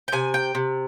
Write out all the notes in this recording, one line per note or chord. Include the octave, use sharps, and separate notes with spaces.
G5
C3 G#5
G5
C3